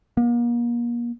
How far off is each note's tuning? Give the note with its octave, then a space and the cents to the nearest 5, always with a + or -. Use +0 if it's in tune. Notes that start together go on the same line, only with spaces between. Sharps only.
A#3 +35